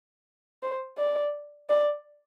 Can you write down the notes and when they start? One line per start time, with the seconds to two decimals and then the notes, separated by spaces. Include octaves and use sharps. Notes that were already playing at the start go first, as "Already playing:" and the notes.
0.63 C5
0.98 D5
1.69 D5